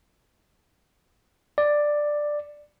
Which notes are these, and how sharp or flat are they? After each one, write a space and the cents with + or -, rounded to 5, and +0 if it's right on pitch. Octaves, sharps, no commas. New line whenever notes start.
D5 +10